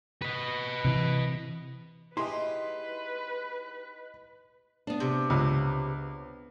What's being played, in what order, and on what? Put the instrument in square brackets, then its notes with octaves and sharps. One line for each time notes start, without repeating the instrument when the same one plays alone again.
[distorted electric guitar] B4 D#5
[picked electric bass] C3 E3
[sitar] D#4 G4 [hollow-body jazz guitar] E4 G#4 [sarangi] B4 [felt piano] C6
[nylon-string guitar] B3 D4
[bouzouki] C3
[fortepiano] C#2